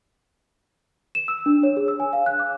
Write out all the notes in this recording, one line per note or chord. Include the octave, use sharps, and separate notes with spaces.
E7
E6
D4
C#5
G#4
E6
G#5
F5
F#6
D6